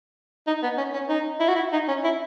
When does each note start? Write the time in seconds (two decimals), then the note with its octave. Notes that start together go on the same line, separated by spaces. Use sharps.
0.47 D#4
0.63 B3
0.77 C#4
0.93 C#4
1.09 D#4
1.40 E4
1.48 F#4
1.55 E4
1.72 D#4
1.88 C#4
2.04 E4